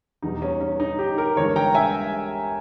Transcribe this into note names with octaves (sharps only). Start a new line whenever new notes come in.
E2 B2 G3 D#4
C#4
C#4
D#4
D#4 G4
G4 A#4
G1 G2 E3 G#3 A#4 C#5
G5 A#5
E5 G#5